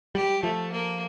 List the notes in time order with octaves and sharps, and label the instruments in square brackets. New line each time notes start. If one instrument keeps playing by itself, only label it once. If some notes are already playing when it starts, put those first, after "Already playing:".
[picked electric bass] G3 [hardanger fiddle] G4
[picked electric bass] F3 [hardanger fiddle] A3
[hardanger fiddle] A#3